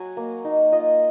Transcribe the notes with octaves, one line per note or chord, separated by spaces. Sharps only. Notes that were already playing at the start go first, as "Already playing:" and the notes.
Already playing: F#3 F#5 G#5
A#3
D#4
F4 D#5